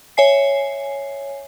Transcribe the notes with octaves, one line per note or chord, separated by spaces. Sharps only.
C#5 E5 G#5 C7